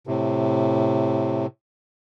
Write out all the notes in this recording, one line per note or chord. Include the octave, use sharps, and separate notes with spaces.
A2 C3